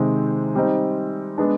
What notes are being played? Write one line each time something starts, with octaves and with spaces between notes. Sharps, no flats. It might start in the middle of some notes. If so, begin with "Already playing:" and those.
Already playing: C3 D#3 G#3 C4
G3 C4 D#4
G#3 B3 D4